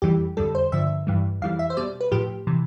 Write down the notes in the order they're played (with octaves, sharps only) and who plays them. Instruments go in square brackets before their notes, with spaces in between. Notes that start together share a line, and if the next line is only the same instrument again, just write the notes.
[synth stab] F2 E3 G3 G4
F2 D3 G3 A4
C5
G2 D3 F3 E5
G2 E3 G3
F2 E3 G3 F5
E5
C5
B2 G3 D5
B4
A2 F3 G4
C3 E3